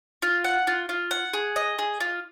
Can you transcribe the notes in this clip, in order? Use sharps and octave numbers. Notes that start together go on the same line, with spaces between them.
F4
F#5
F4
F4
F#5
G#4
D#5
G#4
F4